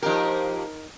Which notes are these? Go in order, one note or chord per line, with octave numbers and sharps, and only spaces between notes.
F3 A#3 D#4 G4 A#4